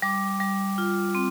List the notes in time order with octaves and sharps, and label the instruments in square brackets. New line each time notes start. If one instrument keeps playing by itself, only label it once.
[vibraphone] G3 D6
G3
F4
C4